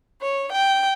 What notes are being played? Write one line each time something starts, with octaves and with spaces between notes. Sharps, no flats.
C#5
G5